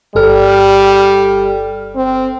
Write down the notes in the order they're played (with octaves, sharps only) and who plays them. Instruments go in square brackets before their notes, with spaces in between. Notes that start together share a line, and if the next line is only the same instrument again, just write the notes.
[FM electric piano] G1 A4 F6 [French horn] G3
[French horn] C4